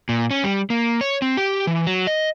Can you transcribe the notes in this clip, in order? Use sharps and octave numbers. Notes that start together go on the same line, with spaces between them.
A#2
C#4
G3
A#3
C#5
C4
G4
E3
F#3
D#5